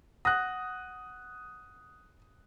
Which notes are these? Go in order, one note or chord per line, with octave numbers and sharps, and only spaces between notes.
F#5 D#6 F#6 A#6